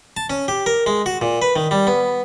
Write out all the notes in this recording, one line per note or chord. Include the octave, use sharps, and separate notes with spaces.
A5
C#4
G4
A#4
G#3
F#4
A#2
B4
D#3
G3
B3